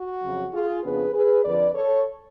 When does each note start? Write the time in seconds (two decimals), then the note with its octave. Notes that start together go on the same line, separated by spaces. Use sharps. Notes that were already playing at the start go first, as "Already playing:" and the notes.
Already playing: F#4
0.22 F2 C#3 F#3
0.53 F4 G#4
0.83 F2 C#3 F3 B3 D4 G#4 B4
1.13 G#4 B4
1.44 F2 D3 F3 B4 D5
1.74 A4 C#5